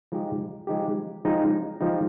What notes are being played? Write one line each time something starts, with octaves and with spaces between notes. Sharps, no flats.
F3 G#3 D#4 G4
F3 G#3 D#4 G4
F3 G#3 D#4 G4
F3 G#3 D#4 G4